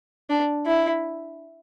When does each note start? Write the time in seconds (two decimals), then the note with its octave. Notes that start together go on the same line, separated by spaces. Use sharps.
0.30 D4
0.66 E4